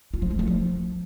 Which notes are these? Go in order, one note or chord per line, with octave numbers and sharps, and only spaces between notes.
F4
F3
G#3
A3
F3